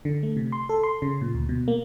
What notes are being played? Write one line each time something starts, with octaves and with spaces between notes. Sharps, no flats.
D3
A3
C3
C6
A4
C6
C#3
A#2
D2
B2
A#3